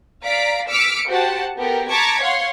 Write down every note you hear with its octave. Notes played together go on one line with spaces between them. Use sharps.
D5 F5 A#5 B6 D7
D6 E6 F6 B6 C#7 D7
F#4 G4 C5 F#5 A5
B3 G4 A4 A#4
A5 A#5 C#6 D6 G#6 B6
C#5 F5 F#5 C6